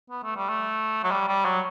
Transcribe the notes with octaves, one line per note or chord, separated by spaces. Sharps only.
B3
A3
G3
A3
F#3
G3
G3
F#3